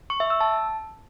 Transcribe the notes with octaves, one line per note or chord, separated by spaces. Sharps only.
C#6
E5
E6
A5